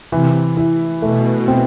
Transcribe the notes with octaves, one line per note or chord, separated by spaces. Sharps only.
C3 E3
E4
B2 A3
C4